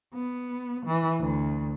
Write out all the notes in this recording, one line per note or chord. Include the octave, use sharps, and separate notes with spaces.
B3
E3
D2